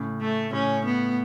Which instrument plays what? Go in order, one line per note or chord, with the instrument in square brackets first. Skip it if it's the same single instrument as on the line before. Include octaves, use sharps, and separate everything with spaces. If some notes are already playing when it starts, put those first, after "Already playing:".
Already playing: [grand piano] A2 C#3
[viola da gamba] A3
[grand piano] A2 C#3 [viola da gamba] C#4
[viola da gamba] B3